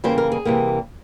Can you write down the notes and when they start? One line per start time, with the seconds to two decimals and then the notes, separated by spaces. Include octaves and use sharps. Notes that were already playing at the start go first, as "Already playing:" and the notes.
0.04 C#3 E3 G3 A#3 C5
0.18 A#4
0.32 G#4
0.45 C3 E3 G3 A#3